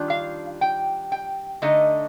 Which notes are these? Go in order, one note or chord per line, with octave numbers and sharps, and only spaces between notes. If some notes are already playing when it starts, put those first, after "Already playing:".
Already playing: D#3 G3 D4 F4
F5
G5
G5
D3 A3 D#4 D#5